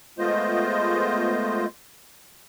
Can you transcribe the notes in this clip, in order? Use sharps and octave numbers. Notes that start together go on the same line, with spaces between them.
G#3 A3 B3 F4 C5 D#5